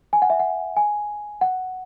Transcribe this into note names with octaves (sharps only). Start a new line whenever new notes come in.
G#5
F#5
E5
F#5
G#5
F#5